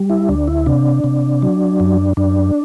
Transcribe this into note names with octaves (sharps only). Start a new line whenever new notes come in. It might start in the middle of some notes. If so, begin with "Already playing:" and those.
Already playing: G3
E4
D2 D4
E4
C3 D4
C3
F#3
F#2
F#2 D4